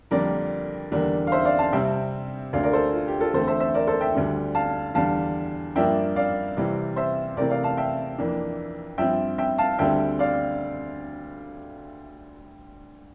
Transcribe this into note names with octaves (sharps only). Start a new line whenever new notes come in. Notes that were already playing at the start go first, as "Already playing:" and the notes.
F2 D3 G3 A#3 D4 A#4 D5
E2 D3 G3 A#3 D4
F5
C5 E5
D5 F5
F5 A5
C3 G3 C4 E5 G5
D2 D3 A3 D5 F5
A#4 D5
A4 C5
F4
G4
F4 A4
E2 D3 A3 C4 A4 C5
C5 E5
C5 E5
A#4 D5
A4 C5
E5 G5
D2 D3 G3 D4
F5 A5
E2 D3 G3 F5 A5
G2 F3 A#3 D4 E5 G5
D5 F5
C3 E3 G3 C4
C5 E5
C3 E3 A3 C4 A#4 D5
D5 F5
F5 A5
E5 G5
F2 E3 A#3 D4
G2 F3 C4 E5 G5
E5 G5
F5 A5
D2 D3 G3 C4 E5 G5
D5 F5